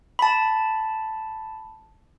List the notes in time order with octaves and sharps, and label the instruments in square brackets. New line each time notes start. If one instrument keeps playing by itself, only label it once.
[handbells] A5 B5